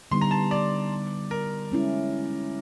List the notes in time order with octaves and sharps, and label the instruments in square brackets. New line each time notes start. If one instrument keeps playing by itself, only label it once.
[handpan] D3 G3 B3 D#4 [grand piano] C6
[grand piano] A#5
A5
D5
A#4
[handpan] G#3 C#4 E4